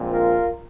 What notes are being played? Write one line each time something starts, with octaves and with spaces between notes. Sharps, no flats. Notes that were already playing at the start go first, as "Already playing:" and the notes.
Already playing: A#1 A#2 G#3 C4
F4 A#4